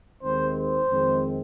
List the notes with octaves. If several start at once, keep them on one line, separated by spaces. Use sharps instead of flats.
D#2 D#3 G#3 C4 C5
C5
F2 D#3 G#3 C4